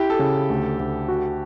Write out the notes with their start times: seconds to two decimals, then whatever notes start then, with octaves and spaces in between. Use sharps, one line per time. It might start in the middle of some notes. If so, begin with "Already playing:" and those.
Already playing: E4 G4
0.10 A4
0.19 C#3
0.50 D2
0.80 D2
1.08 F#4